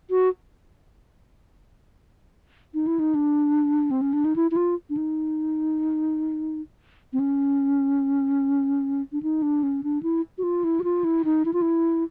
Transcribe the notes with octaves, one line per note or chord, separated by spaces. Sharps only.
F#4
D#4
E4
D#4
D4
C4
C#4
D4
D#4
E4
E4
F4
D4
D#4
C4
C#4
D4
D#4
D4
C#4
D4
E4
F#4
F4
E4
F#4
F4
E4
D#4
E4
F4
E4